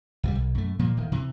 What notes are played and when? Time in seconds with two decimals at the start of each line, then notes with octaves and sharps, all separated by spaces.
0.23 C#2 F#3 G3
0.35 B1
0.55 F#2 A3
0.79 A#2 F3 A#3
0.97 D1 D#3
1.12 C3 E3